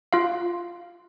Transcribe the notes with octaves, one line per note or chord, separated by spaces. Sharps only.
F4 F5